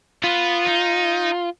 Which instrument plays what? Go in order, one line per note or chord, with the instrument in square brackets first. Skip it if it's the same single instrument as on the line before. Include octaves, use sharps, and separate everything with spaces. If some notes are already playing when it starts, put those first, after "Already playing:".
[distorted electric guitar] B3 B4 [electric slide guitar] F4
[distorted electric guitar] D#4